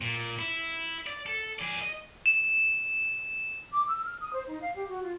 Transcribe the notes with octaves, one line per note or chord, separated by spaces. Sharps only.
A#2
E4
D5
A4
G#4 D5
D#5
E7
D6
E6
F6
D#6
C5
D#4
F5
G4
F#4
F4